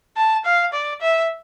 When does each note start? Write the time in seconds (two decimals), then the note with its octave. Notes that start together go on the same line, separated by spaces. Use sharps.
0.17 A5
0.45 F5
0.73 D5
1.01 E5